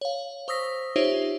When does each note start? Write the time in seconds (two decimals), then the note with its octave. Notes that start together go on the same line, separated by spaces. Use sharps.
0.01 C#5 F5
0.48 C5 C#6 D#6 E6 A#6 B6
0.96 D#4 F4 G4 C5 C#5 E5